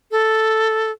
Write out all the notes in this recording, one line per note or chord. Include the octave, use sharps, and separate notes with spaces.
A4